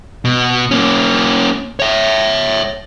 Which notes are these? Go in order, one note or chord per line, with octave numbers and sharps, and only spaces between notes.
B2
A#3 C#4
C#5 E5